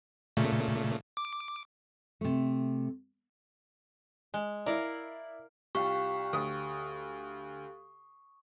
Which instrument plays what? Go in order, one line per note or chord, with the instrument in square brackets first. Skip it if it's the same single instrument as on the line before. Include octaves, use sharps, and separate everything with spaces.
[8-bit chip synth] A#2 C#3 A3
D6
[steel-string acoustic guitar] C3 A3
[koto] G#3
[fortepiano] E4 D5 [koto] A#4 F5
[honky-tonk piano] C2 F4 [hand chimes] G4 F5 G5 [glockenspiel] C#6
[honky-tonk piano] D2 D#6